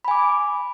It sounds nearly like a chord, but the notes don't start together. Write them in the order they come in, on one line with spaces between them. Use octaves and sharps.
B5 G#5 D6